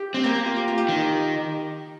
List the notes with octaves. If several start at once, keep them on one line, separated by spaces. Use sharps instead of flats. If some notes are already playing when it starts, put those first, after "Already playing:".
Already playing: F4 G4
C4
A#3 G4
G4
F4
G4
F4
G4
D#3